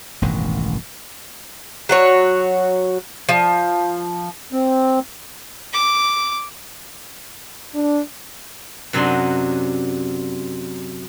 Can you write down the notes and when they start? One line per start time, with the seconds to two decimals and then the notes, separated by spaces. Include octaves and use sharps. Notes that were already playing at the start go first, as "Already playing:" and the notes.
0.22 E1 A1 G2 D#3
1.89 F#3 F#4 C#5
3.29 F3
4.53 C4
5.73 D6
7.74 D4
8.93 F#2 C3 F#3 D4 D#5 C6